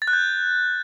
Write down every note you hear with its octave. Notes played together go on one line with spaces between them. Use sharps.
A6
F#6
G6